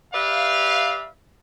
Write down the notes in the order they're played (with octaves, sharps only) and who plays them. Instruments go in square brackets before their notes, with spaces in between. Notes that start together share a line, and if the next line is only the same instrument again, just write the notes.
[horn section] G4 B4 D5 E5 F5